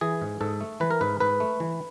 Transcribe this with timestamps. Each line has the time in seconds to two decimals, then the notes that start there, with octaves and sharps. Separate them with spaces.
0.01 E3 G#4
0.22 G#2
0.41 G#2 A4
0.61 A3
0.80 E3 B4
0.91 A#4
1.01 G#2 B4
1.20 G#2 B4
1.40 A3
1.60 E3